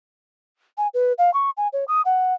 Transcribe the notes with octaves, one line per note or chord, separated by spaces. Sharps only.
G#5
B4
F5
C#6
G#5
C#5
D#6
F#5